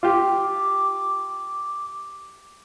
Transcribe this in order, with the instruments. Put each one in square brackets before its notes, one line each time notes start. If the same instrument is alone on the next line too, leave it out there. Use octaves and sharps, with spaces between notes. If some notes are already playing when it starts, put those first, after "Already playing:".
[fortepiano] F4 G4 [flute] D6